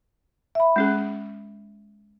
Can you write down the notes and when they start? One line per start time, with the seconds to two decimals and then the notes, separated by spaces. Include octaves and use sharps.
0.55 E5 B5
0.76 G#3 C#4 G#4